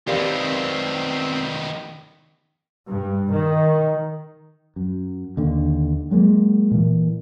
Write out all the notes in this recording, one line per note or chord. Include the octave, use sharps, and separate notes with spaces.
D#3 B3 C4 G4 A#4 C5 D5 F5
G2
D#3
F#2
D#2 D3
F#3 G#3 A#3
A#2 E3